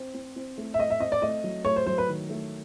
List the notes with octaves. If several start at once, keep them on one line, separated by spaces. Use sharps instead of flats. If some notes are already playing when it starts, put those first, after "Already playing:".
Already playing: C4
C4
C4
A3
E5
A3 D#5
E5
C4 D#5
D5
A3 D#5
F#3
A3 C#5
C5
F#3 C5
B4
D#3
A3